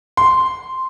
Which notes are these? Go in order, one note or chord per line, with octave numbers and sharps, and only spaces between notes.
C6